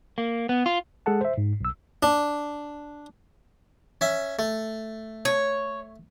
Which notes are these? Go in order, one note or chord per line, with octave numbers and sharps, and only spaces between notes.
A#3
B3
F4
G#3 G#4 A4 F#5 A5
C5 E5
G#2
B1 E6
D4
C#4 E5
A3
C#5